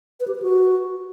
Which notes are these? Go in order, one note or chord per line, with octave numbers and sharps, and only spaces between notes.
B4
G4
B4
F#4